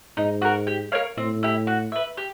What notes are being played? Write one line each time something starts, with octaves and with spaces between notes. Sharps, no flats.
G#2 D#4
F#4 A#4
G4
A#4 C#5 F5
A2 C4
E4 G4
F#4
B4 E5
G4